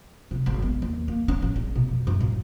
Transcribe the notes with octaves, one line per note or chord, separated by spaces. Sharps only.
C3
G#1
B3
D#2
A#3
C#4
A1
G#3
B2
F2
F#2
A2